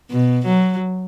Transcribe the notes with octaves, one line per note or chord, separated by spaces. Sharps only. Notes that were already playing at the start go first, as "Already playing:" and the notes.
B2
F#3